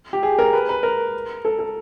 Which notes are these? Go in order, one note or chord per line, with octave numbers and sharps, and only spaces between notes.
G4
G#4
A#4
B4
B4
A#4
A4
A4